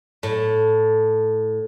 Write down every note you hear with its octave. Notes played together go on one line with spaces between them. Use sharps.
A2